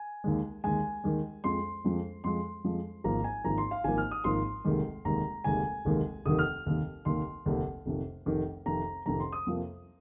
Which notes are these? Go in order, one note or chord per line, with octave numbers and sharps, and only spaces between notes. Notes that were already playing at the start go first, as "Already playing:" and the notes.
Already playing: G#5
D#2 D#3 G#3
D#2 D#3 G#3 G#5
D#2 D#3 G#3
F2 F3 G#3 C6
F2 F3 G#3
F2 F3 G#3 C6
F2 F3 G#3
G#1 G#2 F3 A#3 A#5
G#5
G#1 G#2 F3 A#3 A#5
C6
F5
G#1 G#2 F3 A#3 G#5
F6
D#6
G#1 G#2 F3 A#3 C6
F1 D#2 D#3 G#3
F1 D#2 D#3 G#3 A#5
F1 D#2 D#3 G#3 G#5
F1 D#2 D#3 G#3
F1 D#2 D#3 D#6
F6
F1 D#2 D#3
F1 D#2 D#3 C6
F1 D#2 D#3
F1 F2 C3 D#3
F1 F2 C3 D#3
F1 F2 C3 D#3 A#5
F1 F2 C3 D#3 A#5
C6
D#6
F2 C3 F3 A#3